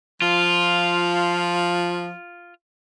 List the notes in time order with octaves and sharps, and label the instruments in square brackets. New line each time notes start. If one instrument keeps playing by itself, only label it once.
[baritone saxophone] F3 [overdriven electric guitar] F4